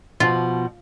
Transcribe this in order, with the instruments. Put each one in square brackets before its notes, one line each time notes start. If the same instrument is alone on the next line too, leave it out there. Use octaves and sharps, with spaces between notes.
[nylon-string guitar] B2 F3 [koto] F4